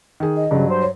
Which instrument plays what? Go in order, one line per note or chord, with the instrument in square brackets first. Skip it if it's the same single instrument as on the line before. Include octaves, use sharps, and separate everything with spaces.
[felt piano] D#3 G#4
[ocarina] D#5
[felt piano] G2 F#3 [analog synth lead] C#3
[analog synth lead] C5
[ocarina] C#5